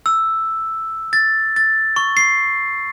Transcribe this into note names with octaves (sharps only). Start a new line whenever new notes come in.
E6
A6
A6
C#6
C7